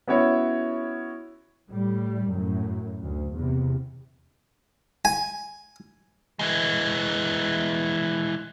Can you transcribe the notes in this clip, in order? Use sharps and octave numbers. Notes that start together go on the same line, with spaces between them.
B3 C#4 E4 F#4 C#5
A2 G3
F#2 A2
D2
E2 C3
G#5
E3 G#3